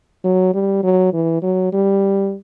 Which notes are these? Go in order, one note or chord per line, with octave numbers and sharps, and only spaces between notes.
F#3
G3
F#3
E3
F#3
G3